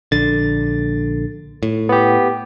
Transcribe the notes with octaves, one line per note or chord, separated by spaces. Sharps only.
A#1 D3 A6
A2
B3 G4